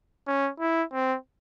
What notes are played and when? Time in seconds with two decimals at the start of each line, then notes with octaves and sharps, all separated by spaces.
0.27 C#4
0.60 E4
0.93 C4